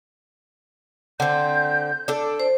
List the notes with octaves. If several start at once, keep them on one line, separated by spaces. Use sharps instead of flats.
D3 C4 G6
D4 A4
C5